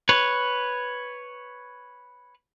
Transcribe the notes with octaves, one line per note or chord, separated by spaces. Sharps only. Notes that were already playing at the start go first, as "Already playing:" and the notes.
B4 C#5